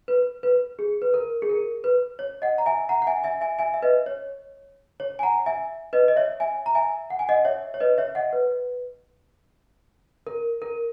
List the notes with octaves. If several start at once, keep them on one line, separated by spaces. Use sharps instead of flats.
B4
B4
G#4
B4
A#4
G#4
A#4
B4
C#5
D#5 F#5
A#5
E5 G#5
F#5 A#5
F#5
E5 G#5
E5 G#5
E5 G#5
E5 G#5
E5
B4 D#5
C#5
C#5
G#5
F#5 A#5
E5 G#5
B4 D#5
D#5
C#5 E5
E5 G#5
A#5
E5 G#5
F#5
G#5
D#5 F#5
C#5 E5
C#5
B4 D#5
C#5 E5
D#5 F#5
B4
A#4
A#4